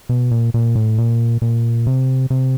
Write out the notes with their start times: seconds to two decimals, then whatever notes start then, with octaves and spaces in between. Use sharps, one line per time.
0.09 B2
0.31 A#2
0.54 A#2
0.75 A2
0.98 A#2
1.42 A#2
1.87 C3
2.30 C3